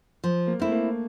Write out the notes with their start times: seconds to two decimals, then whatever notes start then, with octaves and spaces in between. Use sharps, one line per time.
0.24 F3
0.47 A#3
0.60 A3 C4 E4
0.71 A#3